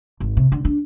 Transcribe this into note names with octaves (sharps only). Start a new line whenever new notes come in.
G#1
C3
D3
D4